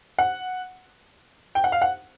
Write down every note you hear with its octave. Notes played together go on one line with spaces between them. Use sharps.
F#5
G5
F#5
F5
F#5